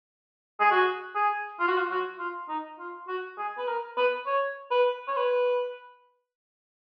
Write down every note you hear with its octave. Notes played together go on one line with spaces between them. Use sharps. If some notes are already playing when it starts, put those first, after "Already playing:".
G#4
F#4
G#4
F4
F#4
F4
F#4
F4
D#4
F4
F#4
G#4
B4
A#4
B4
C#5
B4
C#5
B4